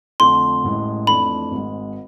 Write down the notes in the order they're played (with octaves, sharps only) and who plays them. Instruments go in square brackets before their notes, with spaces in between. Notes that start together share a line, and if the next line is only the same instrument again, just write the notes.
[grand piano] F2 D3 A3 [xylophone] C6
[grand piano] A1 A2 G#3
[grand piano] F2 E3 A3 D4 [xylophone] B5
[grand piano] G#1 G#2 G#3